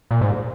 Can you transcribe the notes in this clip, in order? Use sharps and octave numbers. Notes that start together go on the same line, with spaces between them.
A#2
G#2